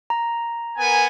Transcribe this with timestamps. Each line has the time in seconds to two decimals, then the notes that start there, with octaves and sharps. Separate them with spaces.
0.10 A#5
0.77 B3 A#4 G#5